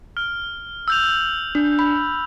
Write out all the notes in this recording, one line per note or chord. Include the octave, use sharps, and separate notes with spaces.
F6
E6 G6 F7
D4
B5